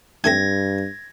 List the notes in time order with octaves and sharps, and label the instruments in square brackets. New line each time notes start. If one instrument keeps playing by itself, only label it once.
[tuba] G2 [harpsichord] D#3 A3 C4 [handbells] G#6 A#6